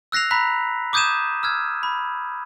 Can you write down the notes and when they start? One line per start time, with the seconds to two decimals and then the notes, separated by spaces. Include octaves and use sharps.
0.12 E6 F#6 A#6 C7 F7
0.31 A#5 B5 F#6 B6
0.93 D6 D#6 G6 G#6 D#7 E7
1.43 E6 F6 G#6
1.83 B5